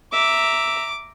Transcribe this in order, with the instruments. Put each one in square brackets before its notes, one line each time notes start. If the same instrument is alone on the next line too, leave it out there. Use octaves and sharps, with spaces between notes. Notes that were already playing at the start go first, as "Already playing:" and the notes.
[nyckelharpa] E5 A#5 [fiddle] D6